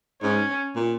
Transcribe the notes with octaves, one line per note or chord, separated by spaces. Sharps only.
G#2 C#4
A#2